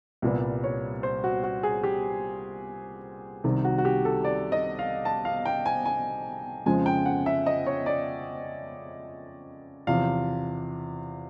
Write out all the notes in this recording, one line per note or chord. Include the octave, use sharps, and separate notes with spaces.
C2 A#2 G3 B3
C#5
C5
F#4
F#4
G#4
G4
C2 C3 D#3
F#4
F#4
G4
A4
D5
D#5
F5
A5
F5
G5
G#5
G#5
F2 C#3 F3 G#3 G#5
G5
F#5
E5
D#5
C#5
D5
E2 C3 F3 F5